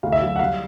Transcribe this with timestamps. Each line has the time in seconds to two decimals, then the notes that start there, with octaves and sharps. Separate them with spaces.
0.03 D2 F5
0.12 E5
0.21 F#3 F5
0.36 F#5
0.39 G3 F5